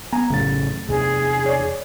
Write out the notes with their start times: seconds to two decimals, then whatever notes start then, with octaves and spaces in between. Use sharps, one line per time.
0.12 B3 G#5 A#5
0.30 A1 F#2 C#3 A3 A6
0.89 E2 C3 G#4
1.46 C#5 D5